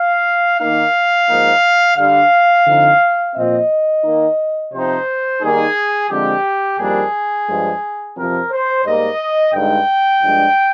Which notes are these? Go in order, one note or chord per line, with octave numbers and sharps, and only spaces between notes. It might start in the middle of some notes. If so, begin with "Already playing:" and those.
Already playing: F5
D#3 A#3 D#4 F5
G#2 F3 A#3 D#4
D3 G3 D4 F5
D3 F3 C4 D#4
A#2 F3 C4 D#5
D#3 A#3 D#4
C3 F3 C4 D#4 C5
D#3 G3 A#3 D#4 G#4
D3 F3 G#3 C4 G4
F2 D#3 G3 A#3 D4 G#4
G2 F3 G#3
F2 C3 F3 C4 A#4
C5
G#2 G3 A#3 D#5
G2 D3 G#3 D#4 G5
G2 F3 G#3 D4